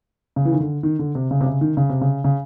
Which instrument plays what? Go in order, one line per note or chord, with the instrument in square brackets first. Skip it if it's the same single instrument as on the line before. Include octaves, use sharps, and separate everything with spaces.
[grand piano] C#3
E3
D#3
D3
D#3
D3
C3
C#3
C3
C#3
D#3
C#3
C3
C#3
C#3